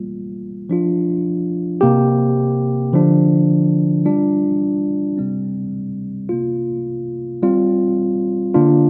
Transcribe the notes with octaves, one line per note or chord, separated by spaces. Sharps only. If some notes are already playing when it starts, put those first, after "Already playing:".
Already playing: G3 A#3 F4
F3 D4 F4
C3 A#3 G4
D3 F3 D4
G3 D4 F4
C3 G3 C4
C3 A#3 F4
G3 C4 F4
D3 A#3 D4 F4